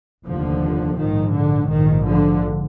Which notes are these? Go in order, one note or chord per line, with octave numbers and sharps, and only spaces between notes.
F1 D#2 D3 F3
A#1 G#2 D#3
D3
A#1 G#2 D#3
D3 F3